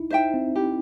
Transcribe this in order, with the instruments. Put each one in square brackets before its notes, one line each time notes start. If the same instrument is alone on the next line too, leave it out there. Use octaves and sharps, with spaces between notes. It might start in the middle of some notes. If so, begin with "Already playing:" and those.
Already playing: [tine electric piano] D#4 E4
[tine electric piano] D#4 [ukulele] C5 E5 G5
[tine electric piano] C4
[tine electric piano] E4 [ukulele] G4